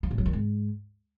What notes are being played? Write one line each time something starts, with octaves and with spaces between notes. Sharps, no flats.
F3
A2
F#3
D#3
G#2